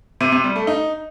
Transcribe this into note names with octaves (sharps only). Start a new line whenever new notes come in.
C3
C3
G3
A3
D#4